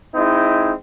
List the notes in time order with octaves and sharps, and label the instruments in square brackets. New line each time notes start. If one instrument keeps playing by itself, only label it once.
[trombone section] G#3 C4 D#4 E4